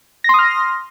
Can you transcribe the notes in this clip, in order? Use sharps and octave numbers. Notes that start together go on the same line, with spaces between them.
C6 D#6 F6 A#6